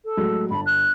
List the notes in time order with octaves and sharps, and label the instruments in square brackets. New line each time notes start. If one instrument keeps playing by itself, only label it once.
[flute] A4
[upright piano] A2 F#3 G#3
[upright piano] G1 A5 [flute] B5
[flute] F#6